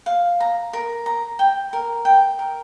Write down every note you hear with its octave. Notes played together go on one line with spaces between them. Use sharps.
F5
A#5
A#4
A#5
G5
A#4
G5
A#4